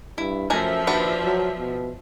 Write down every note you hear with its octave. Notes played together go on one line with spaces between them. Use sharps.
G2 E4
F#2 F3 A3 E5 G#5 A#5
D#2 D4 F#4 B4
F#3
B2